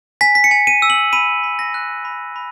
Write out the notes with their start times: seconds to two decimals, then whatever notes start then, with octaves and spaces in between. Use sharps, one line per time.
0.21 G#5 B6
0.35 B6
0.44 C#7
0.51 G#5
0.67 D#7
0.82 E6
0.90 F#7
1.13 B5 D#7
1.43 B5
1.59 A#6
1.74 F#6
2.05 B5
2.36 B5